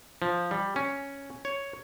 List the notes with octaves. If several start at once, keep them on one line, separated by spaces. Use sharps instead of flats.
F3
G3
C#4
C#5